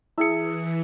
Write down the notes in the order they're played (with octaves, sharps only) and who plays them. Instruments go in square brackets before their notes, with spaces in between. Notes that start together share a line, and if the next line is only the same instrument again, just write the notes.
[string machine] E3 [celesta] E4 C#7 [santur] G#4 E5